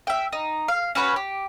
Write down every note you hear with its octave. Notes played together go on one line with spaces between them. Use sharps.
E5 G5
D#4
F5
C#4 F#4 B4 C#5
G4